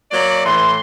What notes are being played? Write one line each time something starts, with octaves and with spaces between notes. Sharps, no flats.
F#3 A#3 D5
A2 E3 C6